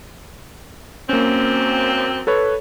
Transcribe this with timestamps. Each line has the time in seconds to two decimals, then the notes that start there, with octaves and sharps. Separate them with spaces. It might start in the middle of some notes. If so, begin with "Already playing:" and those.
1.09 F#2 A#3 C4 C#4
2.27 A4 B4 C#5